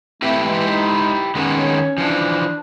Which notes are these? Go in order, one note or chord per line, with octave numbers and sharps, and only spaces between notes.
A3 C4 E4 G4 B4
E3 G#3
D#4
D#3 G#3 B3 C#4
C#5
E3 F3 D4